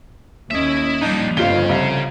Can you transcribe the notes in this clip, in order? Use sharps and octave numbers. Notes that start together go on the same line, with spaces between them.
D#2 C#4 E4 D#5 E5
A#2 F3 G3 D4 D#4
G1 F2 C#3 F4 F5 G7
C2